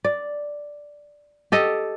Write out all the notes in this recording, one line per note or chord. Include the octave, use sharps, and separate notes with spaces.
D5
G4 A4 D#5